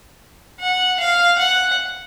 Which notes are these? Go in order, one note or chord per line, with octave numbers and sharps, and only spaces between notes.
F#5
F5
F#5